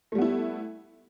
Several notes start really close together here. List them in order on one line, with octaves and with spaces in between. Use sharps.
A3 G3 B3 E4